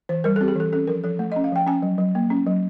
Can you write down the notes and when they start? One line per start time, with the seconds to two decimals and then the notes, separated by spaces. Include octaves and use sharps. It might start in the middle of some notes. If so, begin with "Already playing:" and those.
0.09 E3 C5
0.24 G3 A#4
0.36 A4
0.41 C4 G4
0.48 G#4
0.56 E3 A4
0.72 C#4 A4
0.88 F3 A#4
1.04 F3 A4
1.19 A3
1.32 D#5
1.36 C#4
1.44 F5
1.52 F3 G5
1.67 C#4 G#5
1.82 F#3
1.98 F#3
2.15 A#3
2.30 C#4
2.47 F#3